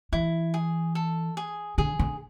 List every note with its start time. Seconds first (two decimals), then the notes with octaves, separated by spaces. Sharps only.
0.12 E3 E4
0.54 G#4
0.95 A4
1.37 G#4
1.78 D3 G#4
1.99 D3